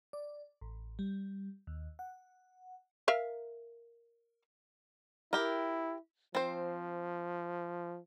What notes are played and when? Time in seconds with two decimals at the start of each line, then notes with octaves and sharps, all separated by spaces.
0.13 D5
0.61 A1
0.99 G3
1.67 D#2
1.99 F#5
3.08 A#4 E5 F5
5.33 E4 G4 A#4
6.35 F3 C4 C5